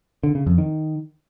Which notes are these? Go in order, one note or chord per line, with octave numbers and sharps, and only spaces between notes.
D3
C#3
F2
D#3